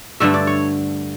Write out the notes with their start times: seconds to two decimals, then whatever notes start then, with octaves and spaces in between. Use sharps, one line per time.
0.20 G2 D3 A3 E5
0.34 D5
0.47 C#5